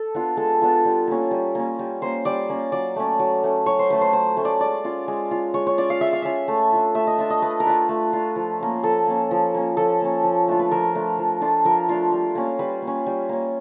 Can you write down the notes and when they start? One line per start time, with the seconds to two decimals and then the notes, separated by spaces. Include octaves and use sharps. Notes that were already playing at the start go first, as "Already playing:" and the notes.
Already playing: A4
0.15 B3 D4 F4
0.37 G#3 A4
0.62 B3 D4 F4
0.85 G3
1.08 A#3 C#4
1.31 G3
1.55 A#3 C#4
1.79 G3
2.02 A#3 C#4 C5
2.25 G3 D5
2.49 A#3 C#4
2.72 F#3 D5
2.96 A3 C#4
3.19 F#3
3.44 A3 C#4
3.66 F#3 C#5
3.79 C5
3.90 A3 C#4 B4
4.01 C5
4.13 F#3 C5
4.37 A3 C#4
4.45 D5
4.60 G#3 D5
4.84 C#4 F4
5.08 G#3
5.31 C#4 F4
5.54 G#3 C#5
5.67 C#5
5.78 C#4 F4 D5
5.90 F5
6.01 G#3 E5
6.13 F5
6.22 C#4 F4 E5
6.48 A3
6.73 D4 F4
6.95 A3 E5
7.07 D#5
7.19 D4 F4 E5
7.30 D#5
7.42 A3 B4
7.60 A#4
7.66 D4 F4 B4
7.89 A3
8.13 D4 F4
8.36 F3
8.60 A#3 C#4
8.83 F3 A4
9.07 A#3 C#4
9.31 F3
9.55 A#3 C#4
9.77 F3 A4
10.01 A#3 C#4
10.24 F3
10.48 A3 D4 F4
10.60 B4
10.71 F3 A#4
10.95 A3 D4 F4
11.19 F3
11.41 A3 D4 F4
11.65 F3 A#4
11.89 A3 D4 F4
12.12 G3
12.35 A#3 C#4
12.59 G3 B4
12.82 A#3
12.87 C#4
13.07 G3
13.29 A#3 C#4